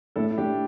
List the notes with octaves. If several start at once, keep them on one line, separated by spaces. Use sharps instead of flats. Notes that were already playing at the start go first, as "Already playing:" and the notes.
A2 E4 A4
E4
A2 D4 G4